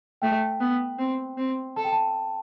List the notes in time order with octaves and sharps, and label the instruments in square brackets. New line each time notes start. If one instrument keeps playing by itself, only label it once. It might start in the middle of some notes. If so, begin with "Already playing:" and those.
[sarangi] A3 [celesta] G5
[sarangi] B3
C4
C4
[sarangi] A4 [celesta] A5
[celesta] G5
A5